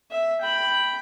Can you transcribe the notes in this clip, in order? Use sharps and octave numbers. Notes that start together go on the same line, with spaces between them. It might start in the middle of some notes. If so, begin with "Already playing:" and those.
E5
G5 B5